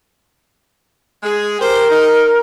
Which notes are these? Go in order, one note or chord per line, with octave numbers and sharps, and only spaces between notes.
G#3 G#4
G4 A#4 C5
D#4